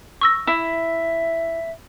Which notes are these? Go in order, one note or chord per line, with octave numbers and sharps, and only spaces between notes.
C#6 E6 A#6
E4 E5